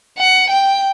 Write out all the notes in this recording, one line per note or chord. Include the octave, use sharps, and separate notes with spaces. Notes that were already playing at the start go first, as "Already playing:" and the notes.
F#5
G5